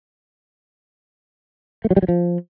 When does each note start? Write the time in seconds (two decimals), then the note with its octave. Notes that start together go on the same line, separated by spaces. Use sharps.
1.85 A3
1.90 F#3
1.96 G3
2.02 F#3
2.08 F3